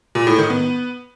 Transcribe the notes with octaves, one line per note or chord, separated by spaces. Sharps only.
A#2
A2
D#3
B3